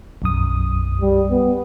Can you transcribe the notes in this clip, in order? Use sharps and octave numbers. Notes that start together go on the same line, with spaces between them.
B1 F#2 D#6
G3
B3